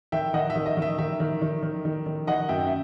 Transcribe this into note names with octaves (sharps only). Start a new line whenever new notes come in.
D#3 E5 G5
D#3 D#5 F#5
E5
D#3
D#5
D#3
E5
D#3 E5
D#3
D#3
D#3
D#3
D#3
D#3 D#5 F#5
F#2 E5 G5
E5